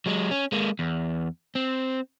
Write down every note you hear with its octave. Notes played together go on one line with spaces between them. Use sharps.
F#3 G#3
C#4
G#3 A#3
E2
C4